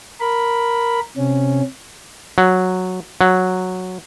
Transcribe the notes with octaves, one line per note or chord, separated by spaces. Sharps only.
A#4 B5
C3 C#4
F#3
F#3